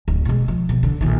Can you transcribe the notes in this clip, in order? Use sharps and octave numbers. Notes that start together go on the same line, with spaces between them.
D1
B2 G#3
F3
B2
D3
A#1 D#3